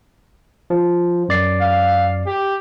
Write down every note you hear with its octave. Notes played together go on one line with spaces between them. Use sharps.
F3
F#2 D5 C7
F5
G4